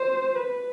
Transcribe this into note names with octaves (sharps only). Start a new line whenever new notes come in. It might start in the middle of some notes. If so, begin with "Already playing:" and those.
Already playing: C5
B4